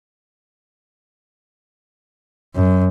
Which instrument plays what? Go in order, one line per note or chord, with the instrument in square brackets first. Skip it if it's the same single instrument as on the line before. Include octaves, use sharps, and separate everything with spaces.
[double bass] F#2